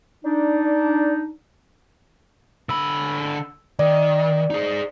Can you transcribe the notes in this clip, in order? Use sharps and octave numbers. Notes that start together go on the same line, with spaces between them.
D4 D#4
D3 B5 E6
D#3 D5
D#4 G#4